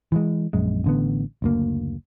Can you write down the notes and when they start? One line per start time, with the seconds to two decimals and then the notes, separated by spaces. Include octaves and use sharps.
0.12 E3 F3 G#3
0.53 A#1 F#2 G#3
0.84 A1 D3 B3
1.42 F#1 D2 A#3